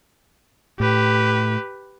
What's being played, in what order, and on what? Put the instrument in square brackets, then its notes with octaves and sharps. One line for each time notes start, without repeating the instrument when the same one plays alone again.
[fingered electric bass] A2 [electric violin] G4 B4